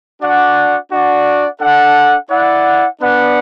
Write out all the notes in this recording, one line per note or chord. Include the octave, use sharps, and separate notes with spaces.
D4 F#4 D5 F#5
D4 F#4 D5 F#5
D4 A4 F#5
E4 D5 F#5
B3 D4 B4 D5 F#5